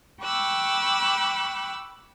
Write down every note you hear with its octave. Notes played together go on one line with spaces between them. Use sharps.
G5 B5 C#6 D6 E6 F#6